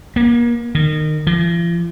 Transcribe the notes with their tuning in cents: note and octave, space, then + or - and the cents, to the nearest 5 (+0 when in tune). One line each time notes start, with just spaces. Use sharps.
A#3 +35
D#3 -25
F3 -45